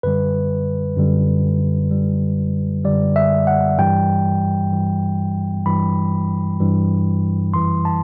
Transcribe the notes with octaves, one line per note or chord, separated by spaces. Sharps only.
F#2 D3 G3 B4
F#2 D3 G3
F#2 D3 G3
F#2 D3 G3 D5
E5
F#5
G2 E3 G3 G5
G2 E3 G3
G2 E3 G3 B5
G2 E3 G3
F#2 E3 G3 C6
A5